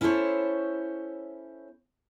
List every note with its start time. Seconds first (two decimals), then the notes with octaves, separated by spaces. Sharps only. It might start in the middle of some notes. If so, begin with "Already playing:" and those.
0.01 C#4 E4 A4 A#4 C5 C#5